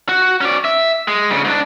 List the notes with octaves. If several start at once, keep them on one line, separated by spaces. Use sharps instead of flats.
F#4
C#4 D5
E5
G#3
D2 C#3
G#2 D4